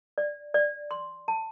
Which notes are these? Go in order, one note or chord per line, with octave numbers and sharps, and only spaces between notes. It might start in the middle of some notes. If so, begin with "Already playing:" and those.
D5
D5
C6
A5